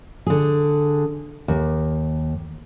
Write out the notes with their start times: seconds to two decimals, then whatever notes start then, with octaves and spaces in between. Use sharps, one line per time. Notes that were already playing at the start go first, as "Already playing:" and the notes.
0.26 D3 G#4
1.48 D#2